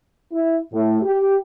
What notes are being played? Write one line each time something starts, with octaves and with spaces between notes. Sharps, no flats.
E4
A2
G4